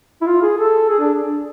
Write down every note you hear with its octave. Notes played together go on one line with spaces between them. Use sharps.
E4
F4
G#4
A4
G#4
D4